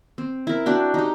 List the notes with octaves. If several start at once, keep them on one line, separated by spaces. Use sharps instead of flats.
C4
E4 A#4
D4 F#4 G5
D#4 G4